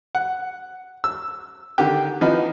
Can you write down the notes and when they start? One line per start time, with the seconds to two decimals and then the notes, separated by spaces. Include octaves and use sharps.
0.15 F#5
1.04 E6
1.78 D3 D#3 G4 G5
2.21 E3 F3 B3 D#4